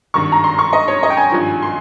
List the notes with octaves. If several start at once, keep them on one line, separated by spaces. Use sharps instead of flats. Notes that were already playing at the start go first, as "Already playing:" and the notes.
G#1 G2 D#3 C#6
A#5
C6
C#6
D#5
C#5
D#5
G5
G#5
G#1 G2 F3
C6